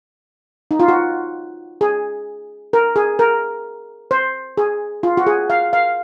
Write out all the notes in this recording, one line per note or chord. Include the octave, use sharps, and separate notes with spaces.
D#4
F4
F#4
G#4
A#4
G#4
A#4
C5
G#4
F4
F#4
G#4
F5
F5